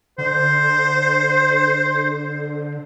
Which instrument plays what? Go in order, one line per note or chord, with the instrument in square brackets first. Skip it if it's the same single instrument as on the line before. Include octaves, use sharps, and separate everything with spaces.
[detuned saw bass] D3 [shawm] C5